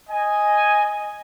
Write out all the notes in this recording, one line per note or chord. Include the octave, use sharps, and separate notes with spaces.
D#5 G#5